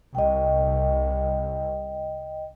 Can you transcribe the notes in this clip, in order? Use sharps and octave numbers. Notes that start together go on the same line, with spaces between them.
C2 D#5 G5